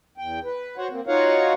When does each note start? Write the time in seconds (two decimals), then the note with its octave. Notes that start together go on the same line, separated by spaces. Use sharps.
0.18 E2 G5
0.44 B4
0.77 F#4 C5 C#5 F#5
0.90 A#3 C4
1.07 D#4 F4 F#4 C#5 F5 F#5